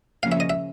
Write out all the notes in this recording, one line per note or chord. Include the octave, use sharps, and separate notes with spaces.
C#3 F3 A#3 C#4 F5
E5
D#5
E5